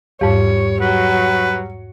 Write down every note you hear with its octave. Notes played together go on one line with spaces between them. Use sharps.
E2 G#2 G3 C#5
F#3 B4